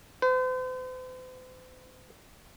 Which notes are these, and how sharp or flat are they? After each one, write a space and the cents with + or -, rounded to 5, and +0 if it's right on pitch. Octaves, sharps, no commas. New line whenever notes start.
C5 -45